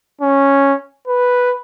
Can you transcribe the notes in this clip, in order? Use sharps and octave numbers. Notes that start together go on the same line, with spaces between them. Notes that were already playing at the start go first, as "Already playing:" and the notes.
C#4
B4